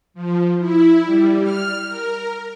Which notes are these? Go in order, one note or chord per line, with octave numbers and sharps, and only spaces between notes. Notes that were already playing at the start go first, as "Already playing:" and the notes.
F3
E4
G3
F6
A#4